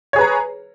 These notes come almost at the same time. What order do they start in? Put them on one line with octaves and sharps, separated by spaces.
C#5 G#4 B4 A#5